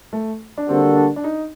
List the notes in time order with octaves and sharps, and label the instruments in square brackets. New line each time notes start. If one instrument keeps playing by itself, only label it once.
[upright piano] A3
D4
[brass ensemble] D3 G3 A#3 F#4 A4 [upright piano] C4
[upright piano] D4
D4
D#4